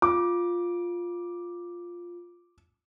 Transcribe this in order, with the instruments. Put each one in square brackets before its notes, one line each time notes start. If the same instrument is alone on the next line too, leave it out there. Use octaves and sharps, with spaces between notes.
[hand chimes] F4 [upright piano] D6